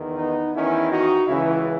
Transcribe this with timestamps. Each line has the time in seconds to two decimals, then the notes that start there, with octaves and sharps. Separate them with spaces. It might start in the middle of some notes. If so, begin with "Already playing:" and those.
Already playing: E2 D#3
0.18 B3 D#4
0.54 E2 D#3 C#4 E4
0.90 D#4 F#4
1.27 C#2 C#3 E3 C#4 E4